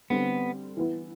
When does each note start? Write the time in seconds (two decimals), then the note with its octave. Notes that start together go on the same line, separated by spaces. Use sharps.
0.10 D3 G3 B3 C4
0.77 E3 B3 E4